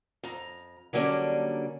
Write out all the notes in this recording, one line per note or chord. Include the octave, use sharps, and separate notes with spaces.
F2 A#5
D3 F#3 G3 A#3 C#4 D4